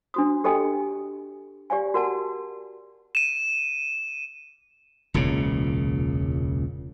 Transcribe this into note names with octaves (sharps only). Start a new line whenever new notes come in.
D4 F#4 D#6
G4 A4 D#5 G5 G#5 D#6
G4 D5 F5 G#5
F#4 A#4 F#5 A5
D#7 E7
E1 C#2 A#2 C#3